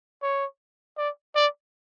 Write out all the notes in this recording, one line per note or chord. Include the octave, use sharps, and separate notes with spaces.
C#5
D5
D5